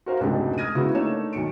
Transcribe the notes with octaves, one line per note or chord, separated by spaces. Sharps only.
F#4 A#4 C5 F5
F1 C#2 G#2 B2 D4 G4
D#6 F6 G#6 A#6 D#7
C#3 G#3 B3 D#4 E4 F#4
A3 A#3 D4 D#4 C#5 E7
B1 D#3 C#7 D7